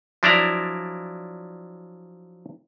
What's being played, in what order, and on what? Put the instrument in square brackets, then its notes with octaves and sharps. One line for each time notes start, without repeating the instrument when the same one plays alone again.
[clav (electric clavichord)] F3 F#3 D4 E4 D5 A#5